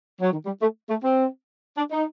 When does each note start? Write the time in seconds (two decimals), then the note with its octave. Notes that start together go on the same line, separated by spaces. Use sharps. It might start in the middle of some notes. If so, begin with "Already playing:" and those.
0.21 F#3
0.32 D#3
0.46 G3
0.61 A3
0.90 A3
1.04 C4
1.77 D4
1.91 D#4